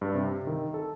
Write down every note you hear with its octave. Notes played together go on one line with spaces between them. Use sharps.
G2
C3
D#3
A4